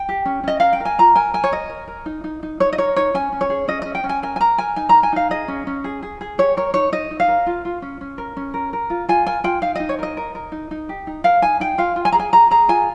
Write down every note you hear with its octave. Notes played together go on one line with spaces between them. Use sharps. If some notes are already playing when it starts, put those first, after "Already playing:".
Already playing: G5
G4
C#4
C#4 D#5
A#4 F5
G5
A#4
G#5
F4 A#5
A#4 G#5
A#4 G#5
C#5
A#4 D#5
A#4
A#4
D#4
D#4
D#4
D#4 C#5
D#5
A#4 C#5
D#4 C#5
C#4 G#5
C#4
C#5
G#4
C#4 D#5
C#4 D#5
G5
C#4
G#5
A#4 G#5
G#5
A#4 A#5
A#4 G#5
D#4 G#5
A#4 A#5
G#5
D#4 F5
G#4 D#5
C#4
C#4
G#4
G#4
G#4
G4 C#5
A#4 C#5
D#4 C#5
D#4 D#5
D#4
F5
A#4
F4
F4
C#4
C#4
A#4
C#4
A#4
A#4
F4
F4 G#5
A#4 G#5
F4 G5
D#4 F5
D#4 D#5
C#5
A#4 D#5
A#4
A#4
D#4
D#4
G4
D#4
A#4 F5
D#4 G#5
D#4 G5
F4 F5
F4
G#5
G#4 A#5
G#5
G#4 A#5
G#4 A#5
F4 G#5